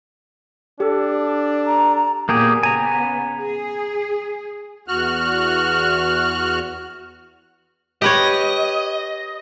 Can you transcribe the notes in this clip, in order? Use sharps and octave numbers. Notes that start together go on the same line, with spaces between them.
D4 G4 A4
A#5
A#2 A#3 B3 G4 G#4
C#3 B3 G#5 A#5
G#4
E2 F#4 F6 F#6
G4 B4 C#5 D#5